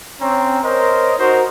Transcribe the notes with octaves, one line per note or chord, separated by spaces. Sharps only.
C4 C#4 C#5 A#5
A#4 C5 C#5 D#5
D#4 F#4 A#4 C5